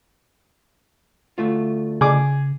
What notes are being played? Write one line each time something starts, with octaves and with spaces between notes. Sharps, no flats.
D2 A3 F4
C#3 G#4 D6